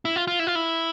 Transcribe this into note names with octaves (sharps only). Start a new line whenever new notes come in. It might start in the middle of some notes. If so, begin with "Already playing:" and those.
E4
F4
F4
E4
F4
E4